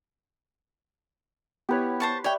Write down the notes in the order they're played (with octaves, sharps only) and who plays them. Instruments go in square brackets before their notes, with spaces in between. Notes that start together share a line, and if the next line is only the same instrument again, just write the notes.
[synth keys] B3 E4 C#5 [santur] G4 B4
[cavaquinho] C5 A5 C#6
[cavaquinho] C#5 G5 [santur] D5 E5